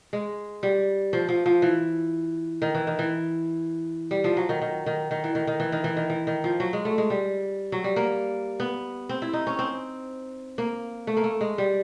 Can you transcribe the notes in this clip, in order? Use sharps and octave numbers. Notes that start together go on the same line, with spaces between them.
G#3
G3
F3
F3
F3
E3
D#3
E3
D#3
E3
G3
F3
F#3
D#3
D#3
D#3
D#3
E3
D#3
D#3
E3
D#3
E3
D#3
E3
D#3
F3
F#3
G#3
A3
G#3
G3
F#3
G3
A#3
B3
C4
E4
D#4
C#4
C4
A#3
A3
A#3
A3
G#3
G3